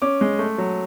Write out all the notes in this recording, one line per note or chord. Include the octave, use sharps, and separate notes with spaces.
C#4 D6
G#3
A3
F#3